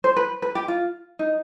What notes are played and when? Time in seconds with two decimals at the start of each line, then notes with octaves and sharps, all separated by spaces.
0.04 C5
0.16 B4
0.42 B4
0.55 G4
0.68 F4
1.19 D#4